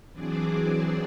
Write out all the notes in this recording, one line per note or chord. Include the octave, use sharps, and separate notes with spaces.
E3 F#3 C4 D4 G#4 D5